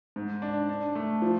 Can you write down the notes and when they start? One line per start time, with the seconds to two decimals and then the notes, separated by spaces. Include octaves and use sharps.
0.16 G#2
0.42 D4
0.69 D4
0.95 A3
1.22 F3